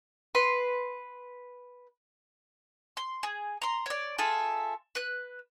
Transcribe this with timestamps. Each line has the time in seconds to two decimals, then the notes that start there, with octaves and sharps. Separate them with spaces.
0.35 B4 C6
2.97 C6
3.23 G#4
3.62 A#5 C6
3.86 C#5 D5
4.18 F4 G#4 A4 E5
4.95 B4 F#6